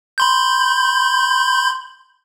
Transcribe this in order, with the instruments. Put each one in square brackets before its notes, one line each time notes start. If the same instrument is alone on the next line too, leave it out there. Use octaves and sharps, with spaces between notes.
[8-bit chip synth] B5 C6 G6